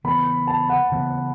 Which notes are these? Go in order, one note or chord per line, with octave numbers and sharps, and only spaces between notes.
C#3 E3 B3 B5
A5
F#5
C#3 E3 B3